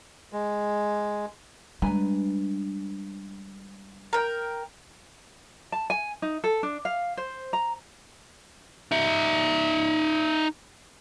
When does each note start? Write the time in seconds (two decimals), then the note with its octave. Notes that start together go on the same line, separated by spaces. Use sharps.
0.33 G#3
1.82 G3 G#3 D4 B4 G#5 A#5
4.13 A#4 G5 A#5
5.72 A5
5.90 G#5
6.22 D#4
6.44 A4
6.63 D4
6.85 F5
7.17 C5
7.53 A#5
8.91 D#4 E5